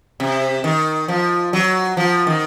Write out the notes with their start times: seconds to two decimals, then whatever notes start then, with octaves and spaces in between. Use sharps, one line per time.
0.20 C3
0.64 D#3
1.08 F3
1.53 F#3
1.97 F3
2.27 D#3